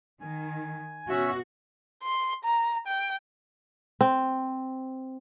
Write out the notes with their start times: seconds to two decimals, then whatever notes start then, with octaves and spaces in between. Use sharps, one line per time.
0.21 D#3 G#5
1.10 B2 C#4 F#4 E5
2.03 C6
2.44 A#5
2.87 G5
4.01 C4